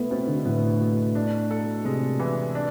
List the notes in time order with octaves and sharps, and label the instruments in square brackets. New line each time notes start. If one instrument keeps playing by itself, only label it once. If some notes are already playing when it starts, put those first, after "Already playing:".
Already playing: [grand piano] A3 B3 [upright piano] E4
[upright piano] B2 [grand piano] C4
[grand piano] D3
[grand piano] A2 [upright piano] B3
[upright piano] B2
D4
A4
[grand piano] C3 [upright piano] G#3
[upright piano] E3
D4